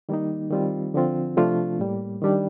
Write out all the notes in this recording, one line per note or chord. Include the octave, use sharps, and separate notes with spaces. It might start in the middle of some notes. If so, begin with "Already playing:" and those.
D#3 G3 A#3 D#4
D#3 G3 C4 F4
D3 F3 C4 F4
C3 F3 A3 D4 F4
A2 G3 A#3
D#3 G3 D4